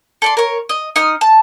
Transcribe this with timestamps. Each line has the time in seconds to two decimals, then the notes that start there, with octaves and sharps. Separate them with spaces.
0.22 A4 D5 C6
0.37 A#4 C#5
0.69 D#5
0.96 D#4 D#6 F6
1.21 A5